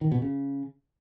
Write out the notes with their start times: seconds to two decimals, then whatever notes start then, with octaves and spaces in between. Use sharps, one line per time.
0.01 D#3
0.11 B2
0.22 C#3